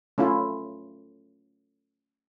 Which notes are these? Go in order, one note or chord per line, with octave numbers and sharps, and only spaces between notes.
A3 C#4 E4 F4